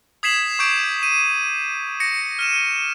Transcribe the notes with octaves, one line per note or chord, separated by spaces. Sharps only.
D#6 G#6 B6 C7 E7 F#7
C#6 D6 G6 D7
D#7
A#6 C#7
F6 D#7 E7